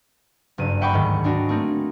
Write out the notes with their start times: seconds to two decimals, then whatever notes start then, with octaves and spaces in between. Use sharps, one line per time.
0.58 F#1 G2 D#7
0.81 E5 F#5 G5 B5 C#6 D6
0.92 D2 G#2 D#3
1.24 G#3 D4 D#4 F#4
1.49 A3 A#3 C4 D#4